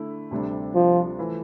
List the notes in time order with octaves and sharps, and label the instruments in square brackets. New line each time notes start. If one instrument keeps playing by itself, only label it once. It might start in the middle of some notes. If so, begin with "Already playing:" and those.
Already playing: [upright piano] D3 A3 E4
D2 C3 G3 D4
[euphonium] F3
[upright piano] E3 A3